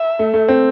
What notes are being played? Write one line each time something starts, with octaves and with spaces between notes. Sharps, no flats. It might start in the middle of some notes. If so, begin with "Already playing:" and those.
Already playing: E5
A3
A3
C4